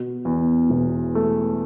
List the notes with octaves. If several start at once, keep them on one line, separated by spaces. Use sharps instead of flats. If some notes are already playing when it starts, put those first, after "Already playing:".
Already playing: B2
E2
E1
A3